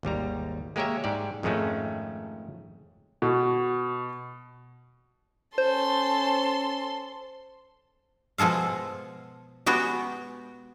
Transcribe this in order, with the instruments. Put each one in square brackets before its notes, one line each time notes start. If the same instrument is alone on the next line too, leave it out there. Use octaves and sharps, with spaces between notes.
[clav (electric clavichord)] G#1 D#2 G3 A#5
G#3 A#3 G4 A#4 C#5 E5
G#2 G4 D5
F2 G#2 D#3 G#3 A3 C#4
[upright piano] B2
[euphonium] C#4 [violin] A4 C6 [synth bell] C5
[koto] B2 F3 G#3 A4 F5
G#3 B3 F#4 G4